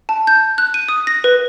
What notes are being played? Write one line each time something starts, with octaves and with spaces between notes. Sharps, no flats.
A5
G6
F#6
D#7
D#6
A#6
B4